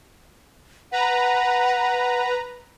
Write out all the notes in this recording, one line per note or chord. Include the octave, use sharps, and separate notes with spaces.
B4 F#5 A#5